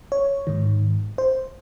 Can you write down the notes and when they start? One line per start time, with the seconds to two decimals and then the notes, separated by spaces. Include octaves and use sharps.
0.12 C#5
0.47 G#2 D#3
1.18 C5